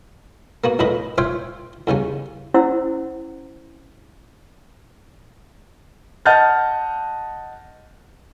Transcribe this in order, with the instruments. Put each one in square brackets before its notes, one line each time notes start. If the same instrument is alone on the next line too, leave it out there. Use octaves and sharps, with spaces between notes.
[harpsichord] A#3 B3 F#4
A#1 F2 A2 B4 D#5 B5
F4 C5 C#5 E5 F5 G5
E2 C#3 G3 C#4
[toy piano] C#4 E4 C5 F#5 A#5 E6
[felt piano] D#5 F#5 A5 F6 G6 A6